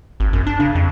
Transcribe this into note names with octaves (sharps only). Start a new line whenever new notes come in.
G#1
F#2
D4
C#3
F2